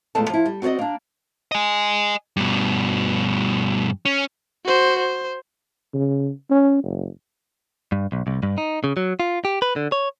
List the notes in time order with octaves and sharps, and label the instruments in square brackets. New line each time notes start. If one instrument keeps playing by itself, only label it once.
[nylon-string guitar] E2 A#2 G#3 A3 A5
F3 E4
G3
C4 F#4 C5 D5 D#5
A#3 D4
[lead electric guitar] D#5 G#5
G2 B2
C#4
[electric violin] F#4 C5
C5
[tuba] C#3
C#4
F#1
[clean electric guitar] G2
B1
C2
G2
D#4
C#3
F#3
F4
G4
B4
D3
C#5